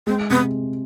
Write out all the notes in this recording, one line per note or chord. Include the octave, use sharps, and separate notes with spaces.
G#3 C4
C3 B3